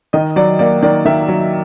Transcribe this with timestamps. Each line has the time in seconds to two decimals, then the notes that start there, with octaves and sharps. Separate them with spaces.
0.13 D#3 D#5
0.36 F#3 D5
0.59 A#3 D5
0.83 D#3 D5
1.05 D#3 E5
1.28 F#3